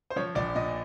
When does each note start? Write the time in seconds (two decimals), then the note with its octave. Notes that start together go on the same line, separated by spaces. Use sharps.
0.10 C5
0.16 F3 C#5
0.35 A#1 D5
0.55 A#2 D#5